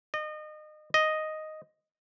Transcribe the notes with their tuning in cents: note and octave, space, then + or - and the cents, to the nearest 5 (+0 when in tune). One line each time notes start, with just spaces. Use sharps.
D#5 -30
D#5 +0